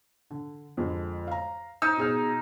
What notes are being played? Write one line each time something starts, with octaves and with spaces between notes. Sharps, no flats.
D3
F2 D3 G#3
F5 A#5
D#4 E6
B2 G#4 F6